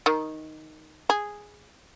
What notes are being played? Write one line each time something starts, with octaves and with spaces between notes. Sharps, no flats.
D#3
G#4